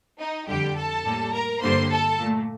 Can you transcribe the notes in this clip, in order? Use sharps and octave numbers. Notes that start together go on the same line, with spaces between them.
D#4 D#5
F2 D3 G3 G4 G5
A4 A5
A2 G3 A#3
A#4 A#5
G2 D3 G3 A#3 C5 C6
A4 A5
A#2 A3